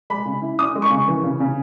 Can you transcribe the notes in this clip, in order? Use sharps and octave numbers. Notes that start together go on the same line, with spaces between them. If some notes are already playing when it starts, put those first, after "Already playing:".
G#3 B5
C#3
E4
C#4 D#6
G#3
C#6
C#3
E3
C#3
C#3